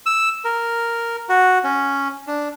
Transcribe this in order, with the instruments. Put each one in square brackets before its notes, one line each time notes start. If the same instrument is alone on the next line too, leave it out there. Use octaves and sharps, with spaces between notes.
[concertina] E6
A#4
F#4
C#4
D4